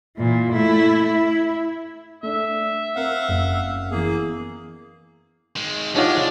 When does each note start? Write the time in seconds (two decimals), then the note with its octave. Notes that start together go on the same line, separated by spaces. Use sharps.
0.17 A#2 E3
0.53 A3 E4
1.02 E4
2.23 A3 D4 E5
2.96 C4 A#4 F5 F#5
3.28 F#1
3.91 E3 A#3 B3 G#4
5.56 D#3 G#3
5.95 F3 G#3 D4 D#4 F4 G4 C#5 F#5